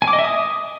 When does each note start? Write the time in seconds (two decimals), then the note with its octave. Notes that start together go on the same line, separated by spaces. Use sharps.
0.02 G#5
0.08 D6
0.13 D#5
0.19 E5
0.24 D#6